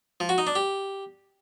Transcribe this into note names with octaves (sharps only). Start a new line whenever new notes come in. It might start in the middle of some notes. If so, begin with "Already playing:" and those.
F3
F#4
D#4
D4
G4